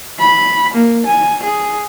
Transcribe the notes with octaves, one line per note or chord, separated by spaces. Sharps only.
B5
A#3
G#5
G#4